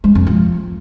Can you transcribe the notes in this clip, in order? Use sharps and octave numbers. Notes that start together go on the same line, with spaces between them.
G#3
F2
F3